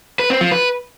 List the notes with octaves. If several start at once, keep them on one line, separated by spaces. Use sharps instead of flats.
B4
C4
F3
B4